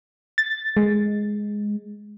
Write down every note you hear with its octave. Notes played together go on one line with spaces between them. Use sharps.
A6
G#3